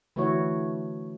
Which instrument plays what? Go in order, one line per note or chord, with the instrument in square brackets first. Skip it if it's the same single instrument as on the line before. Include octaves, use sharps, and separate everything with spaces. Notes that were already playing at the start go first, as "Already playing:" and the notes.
[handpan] D3 E3 A3 E4 F#4 C#5